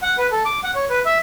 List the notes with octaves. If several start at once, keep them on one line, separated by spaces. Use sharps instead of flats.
F#5
B4
A4
D6
F#5
C#5
B4
E5